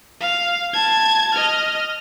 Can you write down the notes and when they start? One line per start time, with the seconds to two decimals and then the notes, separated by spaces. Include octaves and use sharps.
0.21 F5
0.74 A5 G#6
1.34 D#5 F6